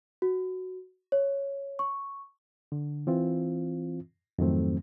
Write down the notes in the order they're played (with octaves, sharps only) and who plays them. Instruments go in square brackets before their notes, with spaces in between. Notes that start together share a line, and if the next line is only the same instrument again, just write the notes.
[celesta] F#4
C#5
C#6
[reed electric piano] D3
E3 C4 F4
F2 G#2 D#3 F#3 A3 C4